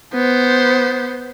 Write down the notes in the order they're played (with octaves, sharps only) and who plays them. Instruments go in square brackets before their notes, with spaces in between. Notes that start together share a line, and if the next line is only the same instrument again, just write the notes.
[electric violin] B3 C5